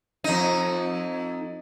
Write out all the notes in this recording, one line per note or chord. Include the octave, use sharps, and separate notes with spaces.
F2 D#4